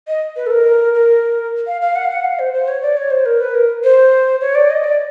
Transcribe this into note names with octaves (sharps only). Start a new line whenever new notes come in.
D#5
B4
A4
A#4
A#4
F5
F5
F#5
F5
F#5
F5
C5
C5
C#5
D5
C#5
C5
A#4
B4
A#4
C5
C#5
D5
D#5
D5